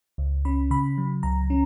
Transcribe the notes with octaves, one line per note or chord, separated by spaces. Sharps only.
C#2
C#4 B5
C#3 B5
F#3
C#2 A#5
C#4